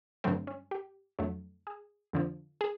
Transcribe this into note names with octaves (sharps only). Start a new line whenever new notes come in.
G2 D3 F#3 A3 C4
C#4
G4
F2 D3 F#3 A3
G#4
F2 D3 F3
G#4